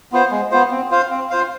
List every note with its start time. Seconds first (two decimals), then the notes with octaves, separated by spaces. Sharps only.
0.12 B3 F4 C5
0.31 G#3
0.51 B3 F4 C5
0.71 C4
0.91 F4 C5 F5
1.10 C4
1.30 F4 C5 F5